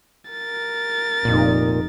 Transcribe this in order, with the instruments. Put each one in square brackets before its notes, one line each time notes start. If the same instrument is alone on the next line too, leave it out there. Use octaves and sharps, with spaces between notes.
[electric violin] A#4 A6
[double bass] F1 D#4 [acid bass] A#2